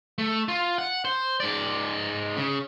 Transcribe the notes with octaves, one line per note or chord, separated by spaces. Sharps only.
A3
F4
F#5
C5
G#2 D5
C#3